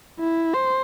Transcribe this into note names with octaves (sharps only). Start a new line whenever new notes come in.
E4
C5